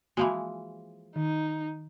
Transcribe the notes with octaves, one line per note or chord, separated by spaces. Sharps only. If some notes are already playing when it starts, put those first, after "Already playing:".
E3 F3 G#3 A#3 F#4
D#3 D#4